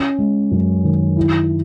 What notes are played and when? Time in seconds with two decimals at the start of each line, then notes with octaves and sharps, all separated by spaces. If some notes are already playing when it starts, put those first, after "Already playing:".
Already playing: C#4
0.19 G#3
0.51 F#2
0.84 D#3
1.17 E4